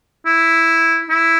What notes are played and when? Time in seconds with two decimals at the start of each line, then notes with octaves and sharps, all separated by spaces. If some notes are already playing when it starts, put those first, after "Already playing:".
0.26 E4
1.09 E4